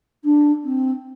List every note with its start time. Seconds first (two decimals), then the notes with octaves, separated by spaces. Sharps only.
0.24 D4
0.64 C4